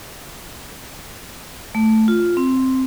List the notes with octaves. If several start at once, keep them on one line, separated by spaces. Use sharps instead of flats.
A3
F4
C4